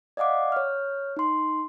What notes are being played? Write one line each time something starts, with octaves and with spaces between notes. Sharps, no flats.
D5 D#5 F5 F#5 D6
C#5 F6
D#4 C6